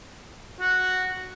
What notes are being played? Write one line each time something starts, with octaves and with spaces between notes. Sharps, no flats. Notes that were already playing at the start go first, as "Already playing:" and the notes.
F#4